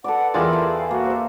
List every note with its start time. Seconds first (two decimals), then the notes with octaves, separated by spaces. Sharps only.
0.04 A4 B4 D5 F#5
0.34 E2 F4 G4 G#4 A#4 D5 E5
0.53 A4 E5 G5
0.76 F5
0.91 A#3 F#4
1.06 C5 E5